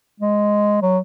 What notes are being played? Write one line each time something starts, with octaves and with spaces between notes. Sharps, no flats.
G#3
F#3